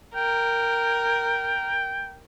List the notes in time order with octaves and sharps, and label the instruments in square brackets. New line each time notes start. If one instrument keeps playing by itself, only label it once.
[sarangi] A#4 [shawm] G5